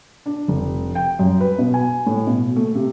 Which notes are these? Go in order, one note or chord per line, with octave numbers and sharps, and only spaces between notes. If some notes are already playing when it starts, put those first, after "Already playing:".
D4
F1
G5
F#2
B4
B2
G#5
A2
B2
A3
C3